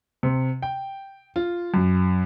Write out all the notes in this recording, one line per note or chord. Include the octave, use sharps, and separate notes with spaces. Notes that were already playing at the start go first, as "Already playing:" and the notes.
C3
G5
F4
F#2